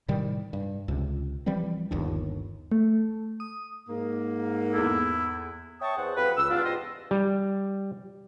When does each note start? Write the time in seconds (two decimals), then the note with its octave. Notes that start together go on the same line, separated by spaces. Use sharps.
0.08 A2 C3 D#3 G3
0.53 G2
0.88 C#2 C3
1.46 E3 F3 G3 C4
1.91 G1 D#2 D4
2.72 A3
3.40 D#6
3.89 G#2 A#3
4.73 E2 E4 A4
5.81 C#5 E5 G5 A5 C#6 D#6
5.96 E2 G#4 C5 F#5
6.16 F2 F4 G4 B4
6.37 C#2 E6
6.51 E2 G3 B3 D4 F4
6.64 E2 G#2 G4 D#5 C6
7.11 G3